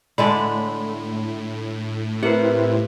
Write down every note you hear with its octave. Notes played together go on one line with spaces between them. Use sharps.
A2 D3 G#3 D4 B5
C4 E4 G4 A#4 B4 F#5